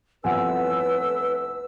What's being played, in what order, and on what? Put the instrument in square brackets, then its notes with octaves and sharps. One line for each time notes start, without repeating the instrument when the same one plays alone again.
[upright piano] G1 C2 F3 [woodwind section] A2 E6 [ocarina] B4 [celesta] F#5 G#5